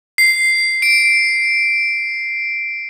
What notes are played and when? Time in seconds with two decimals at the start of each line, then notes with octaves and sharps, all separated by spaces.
0.18 C7
0.82 D7